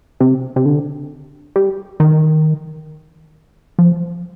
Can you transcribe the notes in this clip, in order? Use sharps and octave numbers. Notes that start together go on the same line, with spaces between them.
C3
C3
D3
G3
D#3
F3